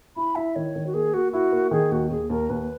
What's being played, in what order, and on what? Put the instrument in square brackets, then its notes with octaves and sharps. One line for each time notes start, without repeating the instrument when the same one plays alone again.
[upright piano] E4 [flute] B5
[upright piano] E4 [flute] E5
[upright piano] D#3 [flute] C#5
[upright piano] D#3
[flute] F#4
[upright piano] A#3 [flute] G#4
[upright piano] A#3 [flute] F#4
[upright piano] E4 [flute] F#4
[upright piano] A#3
[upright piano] D#3 [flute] G#4
[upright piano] D#2 [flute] F#4
[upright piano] D#2 [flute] G#4
[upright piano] D#2 [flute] A#4
[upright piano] D#2 [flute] B4